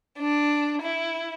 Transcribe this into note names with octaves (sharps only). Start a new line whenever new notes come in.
D4
E4